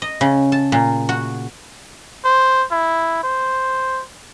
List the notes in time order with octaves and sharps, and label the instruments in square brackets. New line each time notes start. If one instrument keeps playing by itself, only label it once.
[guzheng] D#5
C#3
A5
A#2
F#4
[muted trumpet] C5
E4
C5